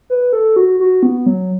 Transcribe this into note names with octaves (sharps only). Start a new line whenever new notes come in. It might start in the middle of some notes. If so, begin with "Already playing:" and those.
B4
A4
F#4
F#4
B3
F#3